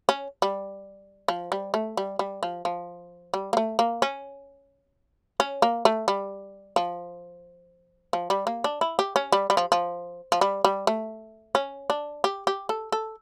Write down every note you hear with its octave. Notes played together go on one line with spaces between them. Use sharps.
C#4
G3
F3
G3
A3
G3
G3
F3
F3
G3
A#3
A3
A#3
C#4
C#4
A#3
A3
G3
F3
F3
G3
A#3
D4
E4
G4
C#4
G3
G3
F3
F3
F3
G3
G3
A3
C#4
D4
G4
G4
A4
A4